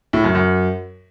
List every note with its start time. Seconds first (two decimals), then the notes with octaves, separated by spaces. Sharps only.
0.13 A2
0.24 F#2
0.35 F#2